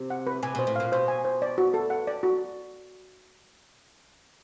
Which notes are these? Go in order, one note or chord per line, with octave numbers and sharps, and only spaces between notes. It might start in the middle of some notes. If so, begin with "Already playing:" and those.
Already playing: C3
F#5
B4
C3 G#5
B2 C5
A2
A#2 F5
B2 C5
G#5
C5
D5
F#4
A4
F#5
D5
F#4